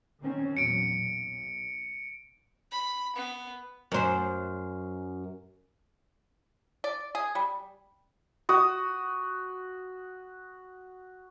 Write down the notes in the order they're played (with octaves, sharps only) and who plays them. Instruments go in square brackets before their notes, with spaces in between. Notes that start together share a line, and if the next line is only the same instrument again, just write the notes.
[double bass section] D#3 C4 C#4
[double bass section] E2 A#2 F#3 [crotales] C#7 D7
[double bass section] B1
[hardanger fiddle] B5
B3
[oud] F#2 C5
[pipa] D5
G#4
G3
[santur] F#4 D#6